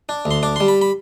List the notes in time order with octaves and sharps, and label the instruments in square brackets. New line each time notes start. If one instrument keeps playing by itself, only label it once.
[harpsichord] D4
D2
C6
D4 D6
C6
G3
B5
B5